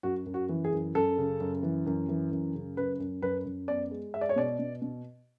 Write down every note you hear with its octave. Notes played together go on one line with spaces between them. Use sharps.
F#2 F#4
F#2
F#4
E3
G#4
F#2
F#2 A4
C#3
F#2
E3
F#2
E3
F#2
C#3
F#2 B4
F#2
F#2 B4
F#2
B3 D5
G#3
G#3 E5
D5
C#5
B2 D5
B2
B2